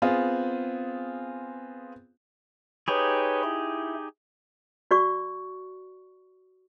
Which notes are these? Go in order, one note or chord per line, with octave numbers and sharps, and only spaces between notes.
B3 C4 F4 G#4
D#4 G4 G#4 B4 C#5
E4
F#4 D5 C#6